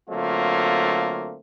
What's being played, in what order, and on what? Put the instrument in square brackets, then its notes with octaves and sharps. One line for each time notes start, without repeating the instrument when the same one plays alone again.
[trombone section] D3 F#3 A3 A#3 C4 F4